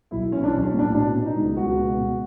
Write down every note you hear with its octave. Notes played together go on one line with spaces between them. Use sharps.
B1 E4
E3 C#4
D4
C#4
B1
C#4
A2
D4
B2 D4
B2
D#4
C#2
C#2 F#4
B2
B2